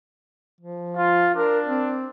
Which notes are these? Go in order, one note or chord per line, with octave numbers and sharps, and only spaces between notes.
F3
F4
D4 A#4
C4